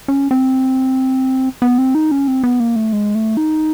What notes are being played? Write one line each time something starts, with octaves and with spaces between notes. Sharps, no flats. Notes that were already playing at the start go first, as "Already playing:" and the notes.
C#4
C4
B3
C4
D#4
C#4
C4
B3
A#3
A3
G#3
A3
D#4